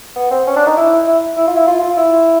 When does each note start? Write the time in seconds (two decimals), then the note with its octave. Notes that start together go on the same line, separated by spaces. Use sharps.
0.16 B3
0.31 C4
0.47 C#4
0.56 D4
0.67 D#4
0.77 E4
1.07 E4
1.37 E4
1.47 F4
1.56 E4
1.67 F4
1.81 F4
1.97 E4